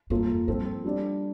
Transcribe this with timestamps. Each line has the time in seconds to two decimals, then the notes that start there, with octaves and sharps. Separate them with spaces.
0.10 G2 A#3 F4 A4
0.30 F2
0.48 G2 F3 C4 F4 A4
0.84 G3 D4 G4 D5